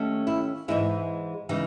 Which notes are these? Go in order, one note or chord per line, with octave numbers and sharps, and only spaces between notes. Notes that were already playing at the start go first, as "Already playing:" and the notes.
Already playing: D#2 A3 C#4
E4
G#2 E3 G#3 D#4 E4
C#3 E3 G#3 D#4